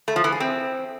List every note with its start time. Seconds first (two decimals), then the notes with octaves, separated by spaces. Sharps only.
0.08 A3
0.16 F3
0.24 E3
0.32 G#4
0.40 C4